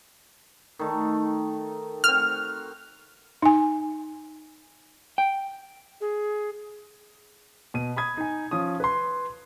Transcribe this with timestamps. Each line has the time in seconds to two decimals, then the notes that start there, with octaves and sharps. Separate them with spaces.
0.79 D#3 A3
2.04 C4 F#4 F6
3.42 D#4 G#5
5.18 G5
6.01 G#4
7.74 B2 D#7
7.96 B5 D#6 G#6
8.17 D#4 G#5
8.51 F3 C#4 D#6
8.80 B4 C6